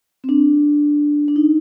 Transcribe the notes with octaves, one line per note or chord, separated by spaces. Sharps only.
C4
D4
D4
D#4